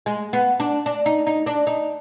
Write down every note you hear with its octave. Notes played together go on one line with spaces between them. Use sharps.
G#3
B3
D4
D4
D#4
D#4
D4
D#4